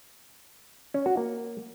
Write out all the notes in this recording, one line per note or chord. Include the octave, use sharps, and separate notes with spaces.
C#4
F#4
A#3